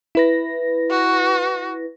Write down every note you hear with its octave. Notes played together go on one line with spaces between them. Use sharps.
E4 B4 A#6
F#4